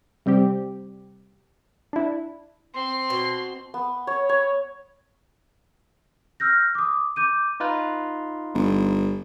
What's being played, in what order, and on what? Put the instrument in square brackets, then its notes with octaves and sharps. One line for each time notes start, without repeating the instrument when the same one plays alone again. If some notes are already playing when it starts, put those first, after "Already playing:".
[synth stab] C3 G3 C4 G4
D4 E4
[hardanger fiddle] C4 [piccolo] C6
[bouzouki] B2
[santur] B3
C#5
C#5
[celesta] E6 F6 G6 A#6
D6 D#6
D6 G6 D#7
[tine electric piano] D#4 F4 B4
[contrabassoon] G1